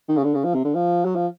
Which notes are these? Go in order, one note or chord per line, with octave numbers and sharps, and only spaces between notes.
D#3
C#3
D3
C#3
F3
C3
D3
F3
F#3
F3